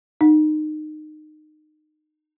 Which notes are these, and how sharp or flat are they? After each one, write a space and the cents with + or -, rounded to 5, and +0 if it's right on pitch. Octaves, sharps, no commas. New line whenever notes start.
D#4 -25